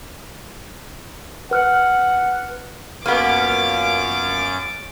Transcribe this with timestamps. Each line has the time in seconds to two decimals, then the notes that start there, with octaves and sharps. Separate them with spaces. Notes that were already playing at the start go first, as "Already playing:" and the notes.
1.51 B4 F#5 F6 F#6
3.06 F#2 A#3 B3 C#4 F4 B4 D6 A6